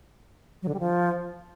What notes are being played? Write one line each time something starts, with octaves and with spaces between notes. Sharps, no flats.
F#3
D3
G3
F3